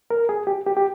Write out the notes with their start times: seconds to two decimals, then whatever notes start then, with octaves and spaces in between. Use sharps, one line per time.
0.11 A#4
0.29 G#4
0.47 G4
0.66 G4
0.77 G4